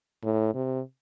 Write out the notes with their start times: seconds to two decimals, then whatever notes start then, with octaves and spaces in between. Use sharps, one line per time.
0.23 A2
0.54 C3